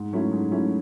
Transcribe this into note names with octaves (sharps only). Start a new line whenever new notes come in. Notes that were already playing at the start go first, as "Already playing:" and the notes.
Already playing: G#2
F#3 A3 C#4 E4
G#2
F#3 A3 C#4 E4